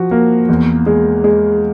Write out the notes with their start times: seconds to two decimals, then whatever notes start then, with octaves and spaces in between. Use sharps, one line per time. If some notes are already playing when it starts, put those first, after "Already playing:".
Already playing: F3 F#4
0.11 A#3
0.49 E2
0.86 G#3
1.24 G#3